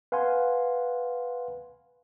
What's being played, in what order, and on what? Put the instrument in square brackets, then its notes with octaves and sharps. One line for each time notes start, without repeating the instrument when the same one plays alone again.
[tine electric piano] B4 F5 F#5 G#5 C6